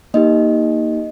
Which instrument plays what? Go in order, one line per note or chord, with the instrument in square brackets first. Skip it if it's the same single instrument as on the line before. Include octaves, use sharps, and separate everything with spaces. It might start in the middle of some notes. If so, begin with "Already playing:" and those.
[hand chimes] A#3 D#4 G4 D#5